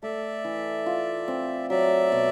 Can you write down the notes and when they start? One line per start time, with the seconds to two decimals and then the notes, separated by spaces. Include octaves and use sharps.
0.02 A3 D5 E5
0.44 E3
0.86 F4
1.28 C4
1.70 F#3 D5 E5
2.12 B2